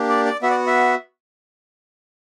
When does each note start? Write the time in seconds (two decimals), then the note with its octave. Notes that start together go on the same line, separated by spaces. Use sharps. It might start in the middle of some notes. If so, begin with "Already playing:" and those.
Already playing: A#3 D4 G4
0.09 D5
0.25 D5
0.42 B3 F#4 E5
0.50 D5
0.66 E5